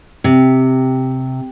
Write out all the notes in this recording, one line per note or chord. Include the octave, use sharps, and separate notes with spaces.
C3